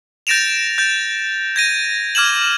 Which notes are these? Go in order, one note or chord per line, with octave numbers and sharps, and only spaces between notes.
G6 A6 A#6 D7 E7 F7
G6 A6
G#6 A#6 D#7
D6 F6 G#6 E7 F#7